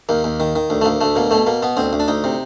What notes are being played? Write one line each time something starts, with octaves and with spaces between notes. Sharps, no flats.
D#2 A#3
D#2
D#3
D#3
D2
A3
D2 A#3
D2 A3
B2 A#3
B2 A3
B2 A#3
B2 B3
D2 C4
D2
D4
D2 D#4
C3